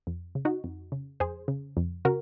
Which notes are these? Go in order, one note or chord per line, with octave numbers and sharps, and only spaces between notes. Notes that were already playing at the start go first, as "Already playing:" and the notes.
F2
C#3
D#4 F#4
F2
C#3
F2 G#4 C5
C#3
F2
C#3 F#4 A#4